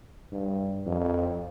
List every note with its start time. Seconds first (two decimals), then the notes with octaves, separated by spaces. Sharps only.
0.32 G2
0.86 F2